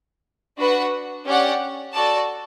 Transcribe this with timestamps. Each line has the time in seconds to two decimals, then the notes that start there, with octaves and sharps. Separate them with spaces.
0.58 D4 F#4 B4 F#5
1.26 C#4 G4 D5 F#5
1.93 F#4 A4 D5 A5